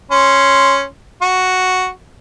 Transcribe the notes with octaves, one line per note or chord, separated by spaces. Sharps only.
C#4 C6
F#4